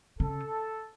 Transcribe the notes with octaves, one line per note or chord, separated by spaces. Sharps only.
C#3 A4